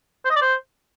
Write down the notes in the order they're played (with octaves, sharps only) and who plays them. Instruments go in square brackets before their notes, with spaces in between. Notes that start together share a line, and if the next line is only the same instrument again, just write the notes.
[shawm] C5
D#5
D5
C5